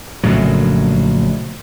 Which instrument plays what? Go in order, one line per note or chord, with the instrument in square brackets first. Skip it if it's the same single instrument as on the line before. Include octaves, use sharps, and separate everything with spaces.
[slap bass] A#1 A2 C#3 F#3